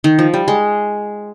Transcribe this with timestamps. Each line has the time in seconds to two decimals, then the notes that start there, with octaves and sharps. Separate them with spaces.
0.04 D#3
0.19 F3
0.34 G3
0.48 G#3